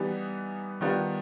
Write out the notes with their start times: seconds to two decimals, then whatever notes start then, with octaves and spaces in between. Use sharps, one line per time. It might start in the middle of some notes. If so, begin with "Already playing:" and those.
Already playing: E3 G3 B3 D#4
0.81 D#3 G3 B3 D4 F4